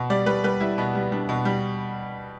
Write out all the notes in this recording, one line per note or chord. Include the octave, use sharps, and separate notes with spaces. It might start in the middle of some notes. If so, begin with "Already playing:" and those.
Already playing: B2
G3 D5
G3 B4
G3 B4
G3 E4
B2 B3
G3
G3 D4
B2
G3